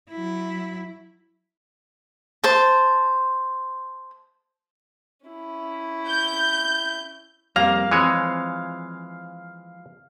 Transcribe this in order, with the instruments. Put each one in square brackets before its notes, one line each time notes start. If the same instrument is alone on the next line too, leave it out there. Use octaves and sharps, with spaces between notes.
[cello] F#3 E4
[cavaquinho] C5 A5
[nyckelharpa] C#4 E4
[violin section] G6
[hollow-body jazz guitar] F2 G3 C4 [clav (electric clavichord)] A#3 A#5 [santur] F5
[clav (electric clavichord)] E3 G#3 C#5 [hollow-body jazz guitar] F3 C4